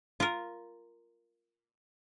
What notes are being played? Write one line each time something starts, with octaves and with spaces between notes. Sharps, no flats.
F4 A#4